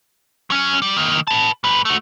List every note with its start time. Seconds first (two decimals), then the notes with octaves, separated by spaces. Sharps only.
0.50 F#3 C#4
0.82 G3
0.97 D#3 A#3
1.27 B4 A5
1.64 G#2 B4
1.85 A3 F#4